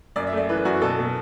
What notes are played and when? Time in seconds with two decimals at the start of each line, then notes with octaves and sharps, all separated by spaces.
0.16 F#2 D5
0.27 E5
0.32 A3 D5
0.49 E3 B4
0.65 F#2 F#4
0.82 B2 A4
0.99 B2